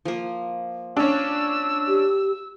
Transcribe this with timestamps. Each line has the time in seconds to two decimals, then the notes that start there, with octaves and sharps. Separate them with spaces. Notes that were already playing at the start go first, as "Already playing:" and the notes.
0.05 F3 A#3
0.97 C#4 D4 E6
1.88 G4